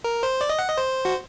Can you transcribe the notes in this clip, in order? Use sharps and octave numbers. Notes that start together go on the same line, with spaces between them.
A#4
C5
D5
D#5
F#5
D#5
C5
F#4